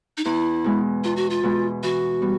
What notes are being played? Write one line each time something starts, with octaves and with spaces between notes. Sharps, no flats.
D#4
E2 E4
B2 G#3 B3
E2 F4
F#4
F4
B2 G#3 B3
E3 F#4
G3 B3